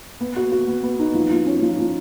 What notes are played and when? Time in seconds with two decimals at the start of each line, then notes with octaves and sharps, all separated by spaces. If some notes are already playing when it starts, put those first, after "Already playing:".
0.21 B3
0.36 F#4
0.52 F#4
0.68 B3
0.83 B3
0.99 D#4
1.14 F3
1.30 F3
1.46 C#4
1.62 F3
1.78 F3